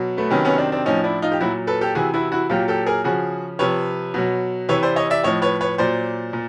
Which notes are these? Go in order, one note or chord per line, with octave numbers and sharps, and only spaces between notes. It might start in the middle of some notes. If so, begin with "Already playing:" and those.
Already playing: B2 F#3
A3 B3
C3 D#3 F#3 B3 C#4
B3 C#4
C4 D4
C4 D4
A2 F3 C#4 D#4
D4 E4
D#4 F4
G4
A#2 F#3 E4 F#4
A4 B4
G4 A4
C3 E3 F#4 G#4
E4 F#4
E4 F#4
A#2 F#3 F4 G4
G4 A4
G#4 A#4
C#3 F3 F#4 G#4
C3 F3 B4 C#5
B2 F#3
C3 E3 B4 C#5
C5 D5
C#5 D#5
D5 E5
A2 F3 C#5 D#5
B4 C#5
B4 C#5
A#2 F#3 C5 D5
A#2